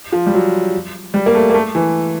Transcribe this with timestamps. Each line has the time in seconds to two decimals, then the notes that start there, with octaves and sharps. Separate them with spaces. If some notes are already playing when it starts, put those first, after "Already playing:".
0.12 F3
0.26 G3
0.33 F#3
1.14 G3
1.26 A#3
1.35 A3
1.50 A#3
1.54 A3
1.75 E3